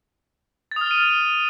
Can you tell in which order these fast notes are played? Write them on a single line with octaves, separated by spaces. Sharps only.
A6 D#6 F6 G7 D#7